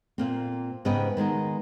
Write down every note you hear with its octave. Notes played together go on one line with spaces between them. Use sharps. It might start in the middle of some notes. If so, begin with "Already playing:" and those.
A#2 A#3 C4
G#2 C#3 B3 B4 D#5 G5
D#3 G#3 B3 D#4